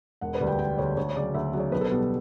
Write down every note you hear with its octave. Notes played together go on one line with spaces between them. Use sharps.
E1 F#5
B4
D2 D3 G3
G5
E1 G5
D2 D3 G3 C#5
D2 C#5
C#5
C#3 F#3 D5
D2 E5
C#3 F#3
C#5
B1 B4
A4
B4
B2 G3